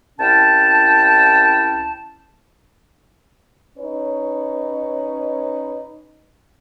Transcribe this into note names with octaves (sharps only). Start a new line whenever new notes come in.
C2 C#4 E4 G5 A5
C#4 D#4 B4 C#5